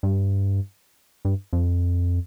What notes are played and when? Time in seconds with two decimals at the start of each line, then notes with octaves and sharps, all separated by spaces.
0.03 G2
1.25 G2
1.53 F2